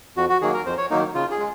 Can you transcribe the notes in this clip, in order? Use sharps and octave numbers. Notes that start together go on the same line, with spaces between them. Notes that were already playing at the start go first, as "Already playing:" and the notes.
F2 F#4
F#4
D#3 F#3 A#3 G#4
A#4
F2 C5
C#5
D#3 F#3 A#3 D#4
C#3 F4
G#4
G#3